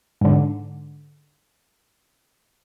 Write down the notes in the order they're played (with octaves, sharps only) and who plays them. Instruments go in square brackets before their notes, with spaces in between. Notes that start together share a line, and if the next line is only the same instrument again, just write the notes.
[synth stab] G#2 D3